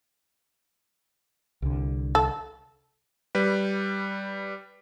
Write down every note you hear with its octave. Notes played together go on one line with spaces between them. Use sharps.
C2 D3
A4
G3 B4